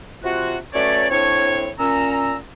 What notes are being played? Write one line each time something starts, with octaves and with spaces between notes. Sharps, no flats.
C3 F4 F#4
F#3 A3 C#4 B4 C#5 D5
A2 C4 D4 E4 C#5
A#2 C#4 A#5 E6